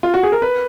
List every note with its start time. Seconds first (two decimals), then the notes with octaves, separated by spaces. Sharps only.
0.03 F4
0.14 F#4
0.23 G#4
0.32 A#4
0.42 B4